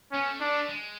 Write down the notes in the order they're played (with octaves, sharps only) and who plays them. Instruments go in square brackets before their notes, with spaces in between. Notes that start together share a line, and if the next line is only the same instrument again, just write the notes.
[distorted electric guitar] B3 [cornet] C#4
[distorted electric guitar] A3
[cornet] D4
[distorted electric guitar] G#3